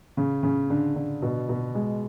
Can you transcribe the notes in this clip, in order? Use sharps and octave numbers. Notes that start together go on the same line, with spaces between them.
C#3
C#3
D3
D3
B2
B2
G#3